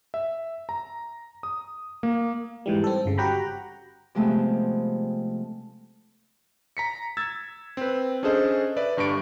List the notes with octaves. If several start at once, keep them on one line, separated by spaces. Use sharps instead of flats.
E5
A#5
D#6
A#3
G#2 E3 G3
C4 A4
G1 C#3
F#4 G4 F#5 G5 A#5 B5
C3 F3 G#3 A3 B3 C4
A#5 B6 C#7
E6 G#6 A6
C4 B4
C#4 D4 G#4 A4 C5 D#5
B4 D5 E5
G1 G2 C#6 D7